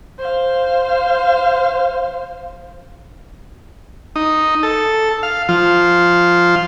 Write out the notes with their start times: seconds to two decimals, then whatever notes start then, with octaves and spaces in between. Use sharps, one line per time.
0.19 C5 F5
4.16 D#4
4.63 A4
5.23 F5
5.49 F3 F4